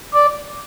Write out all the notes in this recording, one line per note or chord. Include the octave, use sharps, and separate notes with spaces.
D5